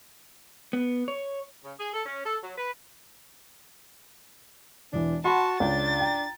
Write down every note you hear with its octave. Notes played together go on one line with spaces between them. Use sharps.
B3
C#5
C#3
G#4
A4
C#4
A4
F#3
B4
E1 E3 D4
F#4 F#5 A5 B5 C6
C#2 D4 A6
G5 A#5